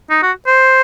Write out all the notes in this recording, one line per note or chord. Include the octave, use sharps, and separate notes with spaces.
D#4
F#4
C5